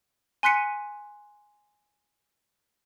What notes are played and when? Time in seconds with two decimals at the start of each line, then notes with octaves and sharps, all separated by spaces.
0.43 G#5 C6 F#6 B6 C#7 D#7